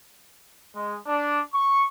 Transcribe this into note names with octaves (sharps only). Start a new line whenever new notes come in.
G#3
D4
C#6